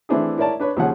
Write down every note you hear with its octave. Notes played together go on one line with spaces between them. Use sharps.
E3 A3 C4 D4 E4 G#4
E4 A#4 C#5 D5 A5
D4 B4 C#5
D#2 C#3 F3 G#4 C#5 F#5